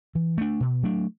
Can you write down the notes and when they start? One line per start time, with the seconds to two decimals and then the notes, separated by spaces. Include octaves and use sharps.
0.15 E3
0.38 A3 D4
0.60 B2
0.83 F#3 A3 D4